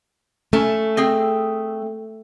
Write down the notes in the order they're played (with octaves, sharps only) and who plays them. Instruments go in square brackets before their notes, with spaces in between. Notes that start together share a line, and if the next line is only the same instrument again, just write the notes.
[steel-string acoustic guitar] A3 [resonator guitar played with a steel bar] C#4 G#5 A5
[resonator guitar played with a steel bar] C4 G#4 G5